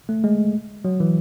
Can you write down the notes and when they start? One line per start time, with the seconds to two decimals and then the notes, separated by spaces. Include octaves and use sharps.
0.09 A3
0.24 G#3
0.85 F#3
1.00 E3